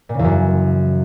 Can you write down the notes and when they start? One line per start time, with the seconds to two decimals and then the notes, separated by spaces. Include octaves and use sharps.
0.09 A#2
0.14 C#3
0.19 E2
0.24 F#2